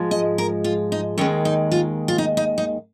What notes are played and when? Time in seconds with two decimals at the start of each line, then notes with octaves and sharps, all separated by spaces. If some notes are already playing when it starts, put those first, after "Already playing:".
Already playing: G#2 F3 G#3
0.11 D#5
0.38 A#4
0.64 F4
0.92 D#4
1.18 D#2 D#3 G#3 C#4
1.45 D#4
1.72 F4
2.08 F4
2.18 D#4
2.37 D#4
2.58 D#4